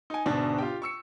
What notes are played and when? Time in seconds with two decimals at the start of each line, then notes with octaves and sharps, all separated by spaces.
0.10 D#4 G#5
0.26 D2 G#2 B2 D4 A6
0.58 F4 G4 G5
0.82 C#6 E6 C#7